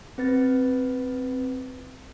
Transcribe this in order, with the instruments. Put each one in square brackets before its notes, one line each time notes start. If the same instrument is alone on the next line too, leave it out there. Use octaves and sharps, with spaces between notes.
[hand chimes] C4 B4 A6